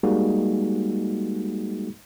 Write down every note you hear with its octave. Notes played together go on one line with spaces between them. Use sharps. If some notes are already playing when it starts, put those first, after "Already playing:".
G3 G#3 A#3 D#4 F#4 G#4